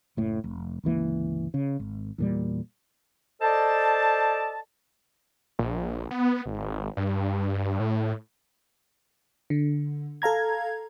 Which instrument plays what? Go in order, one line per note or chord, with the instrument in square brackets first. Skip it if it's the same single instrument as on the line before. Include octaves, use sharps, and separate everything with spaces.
[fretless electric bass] F#1 A2
F1
G1 C#2 E3 A#3
C#3
G#1
E2 A#2 G3
[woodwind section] A4 C5 D5 D#5 A5
[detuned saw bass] A#1
B3
G#1
G2
A2
[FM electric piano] D3
A4 F5 A#5 G#6